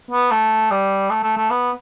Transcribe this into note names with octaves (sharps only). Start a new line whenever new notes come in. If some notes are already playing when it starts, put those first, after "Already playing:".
B3
A3
G3
A3
A3
A3
B3